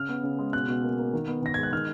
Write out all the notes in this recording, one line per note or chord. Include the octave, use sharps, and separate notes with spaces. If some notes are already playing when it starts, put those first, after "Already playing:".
Already playing: C#3 F6
B3
C#3
G#3
B2 F#6
B2
A#3
A#3
D#3
B3
D#3 A#6
G#3 G#6
F#6
D#3 F6